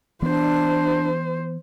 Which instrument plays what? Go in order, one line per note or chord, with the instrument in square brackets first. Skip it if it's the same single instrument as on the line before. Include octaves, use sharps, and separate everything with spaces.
[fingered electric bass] E3 B3 [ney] D4 [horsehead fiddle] C5